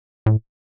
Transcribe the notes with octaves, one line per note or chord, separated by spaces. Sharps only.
A2